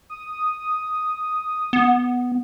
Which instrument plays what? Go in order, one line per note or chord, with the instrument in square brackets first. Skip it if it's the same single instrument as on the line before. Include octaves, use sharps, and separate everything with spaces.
[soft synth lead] D#6
[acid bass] B3